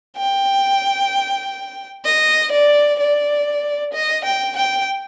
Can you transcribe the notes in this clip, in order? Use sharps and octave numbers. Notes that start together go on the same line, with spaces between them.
G5
D#5
D5
D5
D#5
G5
G5